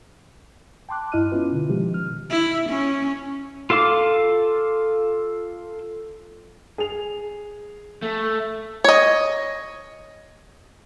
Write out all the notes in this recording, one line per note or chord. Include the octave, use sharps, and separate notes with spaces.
G5 A5 C6 D6 F#6
G2 E4 D#5 F6 F#6 D#7
B3 C#4 E4 F4 B4
B2 D3
B2 D#3 F3 G#3 G4
F6
E4
C#4
F4 A4 F5 D6
G#4 F7
A3
C#5 D#5